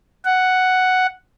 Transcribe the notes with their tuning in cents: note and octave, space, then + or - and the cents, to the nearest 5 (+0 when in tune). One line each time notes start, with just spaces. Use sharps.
F#5 +5